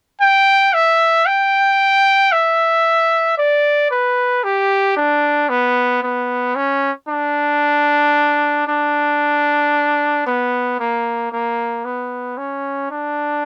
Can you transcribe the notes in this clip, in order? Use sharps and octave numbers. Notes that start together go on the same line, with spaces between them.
G5
E5
G5
E5
D5
B4
G4
D4
B3
B3
C#4
D4
D4
B3
A#3
A#3
B3
C#4
D4